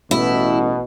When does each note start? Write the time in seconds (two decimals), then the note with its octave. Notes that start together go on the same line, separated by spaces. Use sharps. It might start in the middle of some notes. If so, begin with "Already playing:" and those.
0.11 A1 B2 E4